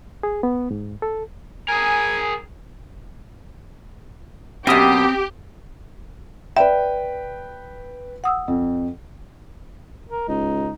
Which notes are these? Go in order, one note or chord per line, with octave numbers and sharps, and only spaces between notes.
G#4
B3
G#2
A4
G#4 A#4 G#5
F#2 B2 C4 G4 D#6
B4 D5 E5 G5
F#5 D#6 E6
F2
A#4
C#2 D#4